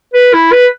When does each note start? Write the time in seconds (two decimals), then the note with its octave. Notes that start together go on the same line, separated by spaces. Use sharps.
0.14 B4
0.33 E4
0.52 B4